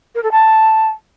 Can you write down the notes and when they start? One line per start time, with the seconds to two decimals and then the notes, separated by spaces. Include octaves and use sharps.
0.15 A#4
0.23 A4
0.32 A5